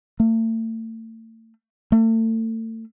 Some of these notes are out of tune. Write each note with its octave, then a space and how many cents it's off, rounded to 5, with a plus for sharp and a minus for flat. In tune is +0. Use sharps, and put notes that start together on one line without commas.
A3 +40
A3 +35